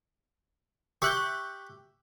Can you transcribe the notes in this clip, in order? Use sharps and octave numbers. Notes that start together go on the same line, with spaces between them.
G4 E5 C#6 F#6 G6